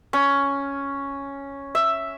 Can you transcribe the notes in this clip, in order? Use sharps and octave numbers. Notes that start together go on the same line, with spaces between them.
C#4
E5